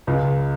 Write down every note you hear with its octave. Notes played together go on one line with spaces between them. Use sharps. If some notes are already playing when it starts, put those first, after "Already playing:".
C#2